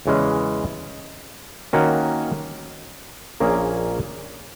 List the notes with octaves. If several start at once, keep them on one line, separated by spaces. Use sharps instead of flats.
E2 C#3 E3 G#3 C#4
D#3 A#3 C#4 F#4
A#1 A#2 A#3 C#4 G#4